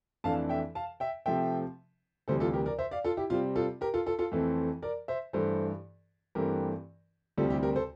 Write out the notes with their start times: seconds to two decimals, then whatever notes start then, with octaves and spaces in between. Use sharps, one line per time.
0.24 F2 E3 A3 D4 F5 A5
0.49 E5 G5
0.75 F5 A5
1.00 E5 G5
1.26 C3 F3 A3 C4 E5 G5
2.28 D2 C3 E3 G3 A4 C5
2.40 F4 A4
2.53 G4 A#4
2.66 A#4 D5
2.79 C5 E5
2.91 D5 F5
3.05 F4 A4
3.17 E4 G4
3.30 C3 G3 C4 F4
3.56 F4 A4
3.81 G4 A#4
3.94 F4 A4
4.06 F4 A4
4.19 F4 A4
4.32 F2 E3 A3 C4
4.83 A#4 D5
5.08 C5 E5
5.33 G2 E3 A3 A4 C5
6.35 G2 E3 A3 C4 G4 A#4
7.38 D2 C3 G3 C4 F4 A4
7.50 E4 G4
7.63 G4 A#4
7.76 A4 C5